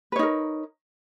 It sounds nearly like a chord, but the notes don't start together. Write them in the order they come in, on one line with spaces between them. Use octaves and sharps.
B4 C#5 D#4 A#4